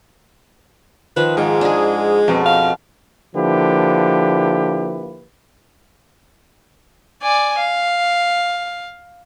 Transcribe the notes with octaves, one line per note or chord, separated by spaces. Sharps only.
D#3 F3 B4
G#2 G#3
D4 G#4
F2 B2
F5
D3 F3 A#3 E4 G4 B4
D5 G#5
F5